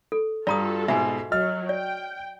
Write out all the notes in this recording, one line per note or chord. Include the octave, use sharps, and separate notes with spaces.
A4
G2 F4 F#4 A4 D5 A#5 D#6
G#2 B2 E5 G#5
F#3 D#5 F6
D5 G5